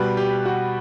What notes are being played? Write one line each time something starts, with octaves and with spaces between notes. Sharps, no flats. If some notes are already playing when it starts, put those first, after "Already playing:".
Already playing: B2 G3 B4
G4
F#4